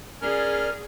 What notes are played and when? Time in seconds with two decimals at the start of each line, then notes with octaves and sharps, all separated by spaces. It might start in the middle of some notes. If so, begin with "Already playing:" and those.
0.22 C#4 G#4 A#4 D5 F6